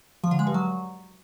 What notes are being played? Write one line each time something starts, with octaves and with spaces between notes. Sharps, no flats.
F3
D3
G#3
G2
F#3